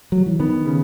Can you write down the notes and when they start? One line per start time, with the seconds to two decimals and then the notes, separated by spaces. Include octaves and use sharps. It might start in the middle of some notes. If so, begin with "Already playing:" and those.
0.12 F#3
0.26 E3
0.39 D#3 B3
0.65 C#3